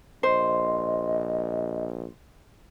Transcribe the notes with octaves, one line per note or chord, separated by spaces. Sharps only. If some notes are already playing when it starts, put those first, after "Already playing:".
A#1 C5 D#5